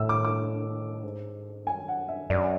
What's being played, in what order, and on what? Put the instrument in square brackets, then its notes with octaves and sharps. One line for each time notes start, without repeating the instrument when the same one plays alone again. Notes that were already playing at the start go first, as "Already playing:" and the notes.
Already playing: [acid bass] A2 [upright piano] E6
[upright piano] D6
D6
[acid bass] G#2
[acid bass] F#2 [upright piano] G#5
[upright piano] F#5
E5
[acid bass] F#2 [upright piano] D5